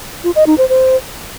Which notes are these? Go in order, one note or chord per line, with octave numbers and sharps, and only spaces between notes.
F4
D#5
D#4
C5
C5